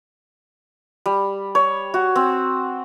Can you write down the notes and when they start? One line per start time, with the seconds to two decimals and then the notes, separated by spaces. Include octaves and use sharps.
1.06 G3
1.55 C#5
1.94 F#4
2.15 C4